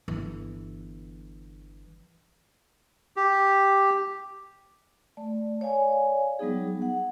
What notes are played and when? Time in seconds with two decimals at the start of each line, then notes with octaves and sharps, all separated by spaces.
0.08 G1 E3
3.17 G4
5.17 A3 D5
5.61 C#5 D5 F5 G#5
6.39 F#3 G3 B3 D#4 G#4
6.82 F#5